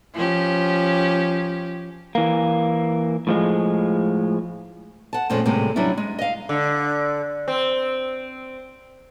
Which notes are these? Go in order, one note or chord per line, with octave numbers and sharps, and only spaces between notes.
F3 C#4 G4
E3 A#3
A2 F3 G#3
F#5 A5
F2 A#2 F3 G#3 A3 C#4
A2 C3 E3 G3 G#3 A#3
F#3 G3 C#4 D4 E4
G#3
D#5 F5
D3
C4